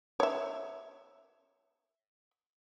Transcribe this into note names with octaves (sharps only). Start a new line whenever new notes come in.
C#5 E5